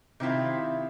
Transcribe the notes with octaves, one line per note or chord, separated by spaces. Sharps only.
C3 D#3 C4 E4 F4